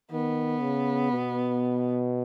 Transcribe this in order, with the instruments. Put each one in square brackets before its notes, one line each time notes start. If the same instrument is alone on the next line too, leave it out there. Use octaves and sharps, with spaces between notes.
[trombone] D#3 [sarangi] B3
[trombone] C#3
B2